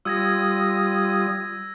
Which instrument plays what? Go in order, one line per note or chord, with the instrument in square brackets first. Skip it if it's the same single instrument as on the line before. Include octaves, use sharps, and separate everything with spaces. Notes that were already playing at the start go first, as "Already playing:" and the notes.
[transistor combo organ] G3 F4 D#6 [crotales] E6 G#6 A#6